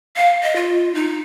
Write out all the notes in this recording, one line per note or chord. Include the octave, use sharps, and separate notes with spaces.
F5
D#5
F4
D#4